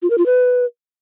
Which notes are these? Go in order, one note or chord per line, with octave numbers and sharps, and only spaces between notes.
F4
A#4
F4
B4